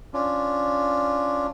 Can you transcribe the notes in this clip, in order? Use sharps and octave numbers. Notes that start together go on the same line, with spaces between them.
C#4 D4 F4